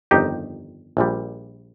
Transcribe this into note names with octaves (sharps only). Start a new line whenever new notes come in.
G1 F2 D#3 D#4 G4
A#1 A#2 G3